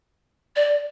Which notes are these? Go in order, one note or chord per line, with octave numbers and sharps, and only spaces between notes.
D5